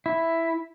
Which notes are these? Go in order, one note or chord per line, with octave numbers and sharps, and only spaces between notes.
E4